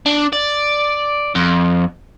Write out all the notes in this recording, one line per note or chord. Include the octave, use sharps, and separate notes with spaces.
D4
D5
F2